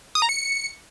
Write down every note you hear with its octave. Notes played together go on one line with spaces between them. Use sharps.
D#6
A#5
C#7